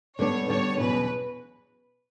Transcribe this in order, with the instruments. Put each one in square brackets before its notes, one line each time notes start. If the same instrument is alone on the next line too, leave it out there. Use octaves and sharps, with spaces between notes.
[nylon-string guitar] D3 G3 B3 D4 [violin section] C#5
[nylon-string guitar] D3 G3 B3 D4 [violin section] C#5
[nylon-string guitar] E2 B2 F#3 C#4 [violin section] B4